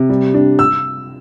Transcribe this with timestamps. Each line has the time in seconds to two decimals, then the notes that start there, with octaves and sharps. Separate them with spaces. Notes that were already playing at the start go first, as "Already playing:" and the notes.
Already playing: C3
0.09 G3
0.34 D4
0.59 E6